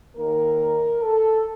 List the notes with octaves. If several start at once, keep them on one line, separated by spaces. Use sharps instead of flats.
D#2 D#3 A#3 A#4
A4